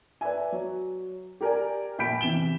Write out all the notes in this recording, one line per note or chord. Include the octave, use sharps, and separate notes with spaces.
B4 D5 E5 G#5
F#3
G4 A#4 D5 G#5
A#1 B5 G6 B6 D7
C3 E3 E7 G7